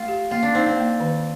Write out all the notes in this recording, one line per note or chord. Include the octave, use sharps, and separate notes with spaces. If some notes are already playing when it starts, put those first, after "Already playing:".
Already playing: A3 F4 A4
G4
A#3 F4
D4
C4 D#4
C4
A#3
D#3